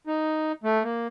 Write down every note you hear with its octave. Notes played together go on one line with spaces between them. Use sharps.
D#4
A3
A#3